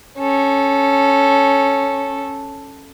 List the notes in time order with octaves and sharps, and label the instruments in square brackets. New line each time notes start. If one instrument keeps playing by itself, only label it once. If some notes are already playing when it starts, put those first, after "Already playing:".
[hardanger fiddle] C#4 A4